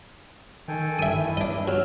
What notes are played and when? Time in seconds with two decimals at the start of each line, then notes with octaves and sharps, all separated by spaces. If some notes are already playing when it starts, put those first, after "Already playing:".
0.68 D#3 A4 G5 G#5
0.99 G2 E5 D#6
1.13 D#3 E4
1.37 G2 D4 D#5
1.68 F#3 E6 F6